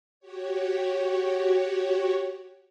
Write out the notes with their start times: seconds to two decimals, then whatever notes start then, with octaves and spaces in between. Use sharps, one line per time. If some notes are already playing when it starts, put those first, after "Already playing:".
0.20 F#4 G4 C#5